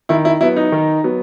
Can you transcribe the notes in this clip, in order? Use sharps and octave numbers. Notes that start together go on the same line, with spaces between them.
D#3 E4
E4
F#3 B3 E4
D#4
D#3
F#3 B3